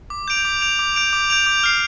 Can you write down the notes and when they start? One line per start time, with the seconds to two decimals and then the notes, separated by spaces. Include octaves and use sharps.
0.10 D6
0.28 G6 D7 F7
0.45 D6
0.61 G6 D7 F7
0.79 D6
0.96 G6 D7 F7
1.13 D6
1.30 G6 D7 F7
1.46 D6
1.63 F6 C7